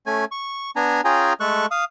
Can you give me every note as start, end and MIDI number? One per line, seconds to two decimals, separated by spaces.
0.06 0.25 57
0.06 0.25 61
0.06 0.25 80
0.31 0.71 85
0.76 1.01 59
0.76 1.01 62
0.76 1.01 80
0.76 1.01 82
1.05 1.33 61
1.05 1.33 65
1.05 1.33 68
1.05 1.33 79
1.05 1.33 80
1.05 1.33 82
1.40 1.66 56
1.40 1.66 57
1.40 1.66 69
1.40 1.66 85
1.40 1.66 90
1.71 1.84 77
1.71 1.84 87